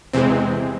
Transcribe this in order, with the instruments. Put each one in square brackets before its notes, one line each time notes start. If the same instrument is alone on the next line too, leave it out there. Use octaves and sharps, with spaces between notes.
[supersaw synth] E2 C3 E3 G#3 C4